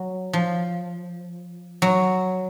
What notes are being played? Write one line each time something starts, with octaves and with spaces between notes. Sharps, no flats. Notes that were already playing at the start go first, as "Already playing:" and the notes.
Already playing: F#3
F3
F#3